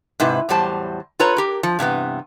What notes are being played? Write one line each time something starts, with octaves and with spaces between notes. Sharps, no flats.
G#2 C3 E4 B4
E2 A2 F#3 G3 C5 A5
F4 A4 B4 C#5 A#5
G4 A#4
F3
G2 C3 E3 B3